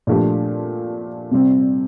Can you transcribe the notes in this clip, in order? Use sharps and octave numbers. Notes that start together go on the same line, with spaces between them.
A#2 F3 A3 D4 G4
C3 G3 C4